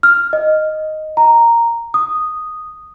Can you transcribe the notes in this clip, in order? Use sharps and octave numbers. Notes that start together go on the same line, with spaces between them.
F6
D#5
A#5
D#6